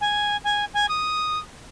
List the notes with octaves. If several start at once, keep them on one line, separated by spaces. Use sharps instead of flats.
G#5
G#5
G#5
D#6